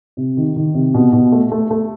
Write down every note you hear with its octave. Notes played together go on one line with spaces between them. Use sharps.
C3
D#3
D#3
C3
B2
B2
A3
A3
A3